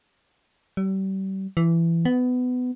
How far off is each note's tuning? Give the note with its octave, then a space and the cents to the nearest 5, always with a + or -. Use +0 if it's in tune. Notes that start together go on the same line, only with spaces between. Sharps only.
G3 -35
E3 +20
B3 +20